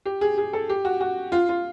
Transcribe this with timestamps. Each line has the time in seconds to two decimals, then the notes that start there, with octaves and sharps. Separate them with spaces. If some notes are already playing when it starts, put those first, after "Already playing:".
0.06 G4
0.21 G#4
0.38 G#4
0.53 A4
0.69 G4
0.85 F#4
1.01 F#4
1.32 F4
1.49 F4